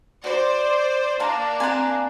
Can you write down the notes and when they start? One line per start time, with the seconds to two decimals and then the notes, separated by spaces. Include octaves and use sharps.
0.24 F#4 C5 D5 D6
1.20 A#3 D4 A#4 F#5 A5
1.60 C4 F#5 G#5